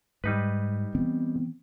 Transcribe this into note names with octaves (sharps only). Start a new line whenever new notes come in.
G#2 G3 D#4 B4
E3 B3 C4